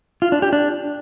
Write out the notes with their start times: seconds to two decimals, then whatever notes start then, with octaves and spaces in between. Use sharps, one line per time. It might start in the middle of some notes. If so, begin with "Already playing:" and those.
0.22 F4
0.32 D4
0.42 G4
0.53 D4